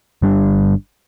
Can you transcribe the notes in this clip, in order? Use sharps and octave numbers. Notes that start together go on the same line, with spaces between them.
G1 G3 D4